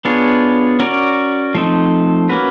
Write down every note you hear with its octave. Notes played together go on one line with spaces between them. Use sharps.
B3 D4 F4 G#4 C#5
C#4 F#4 A#4 D5
F3 A3 C4 D#4
A#3 C#4 F#4 B4